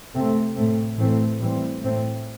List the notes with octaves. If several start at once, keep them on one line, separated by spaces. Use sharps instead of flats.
C3 A3 C4
A2 A3 C4
A2 E3 A3 C4
A2 E3 G3 C4
A2 A3 C4